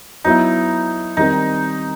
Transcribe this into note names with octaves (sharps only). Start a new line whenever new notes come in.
F#3 B3 D#4 E4
D#3 G3 C4 D#4